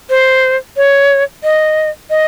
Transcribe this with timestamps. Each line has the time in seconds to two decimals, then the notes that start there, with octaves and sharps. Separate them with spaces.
0.10 C5
0.77 C#5
1.44 D#5
2.10 D#5